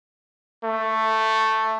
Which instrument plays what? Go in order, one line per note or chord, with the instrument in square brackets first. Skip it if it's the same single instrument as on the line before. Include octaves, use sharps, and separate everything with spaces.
[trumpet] A3